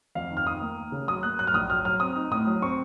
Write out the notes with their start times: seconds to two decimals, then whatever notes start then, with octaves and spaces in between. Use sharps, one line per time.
0.15 F2 F5
0.31 D#3
0.37 F6
0.47 D#3 D#6
0.61 A#3
0.77 A#3
0.92 C#3
1.07 F#3 D#6
1.23 A#3 F#6
1.39 F#3 F#6
1.47 F6
1.54 A#1 D#6
1.70 F#3 F6
1.85 F#3 F6
2.00 C4 D#6
2.16 D#4
2.31 A2 D#6
2.47 F#3
2.62 C4 C#6